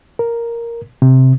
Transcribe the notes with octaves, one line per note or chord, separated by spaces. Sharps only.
A#4
C3